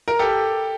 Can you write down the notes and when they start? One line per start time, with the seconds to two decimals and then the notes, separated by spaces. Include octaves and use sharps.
0.08 A#4
0.19 G4 A4